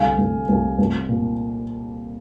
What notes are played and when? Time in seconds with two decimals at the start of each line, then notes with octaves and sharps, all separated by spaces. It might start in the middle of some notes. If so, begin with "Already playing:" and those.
Already playing: C2 D3 F5 G#5
0.18 C2
0.49 C2
0.79 C2
1.09 A#2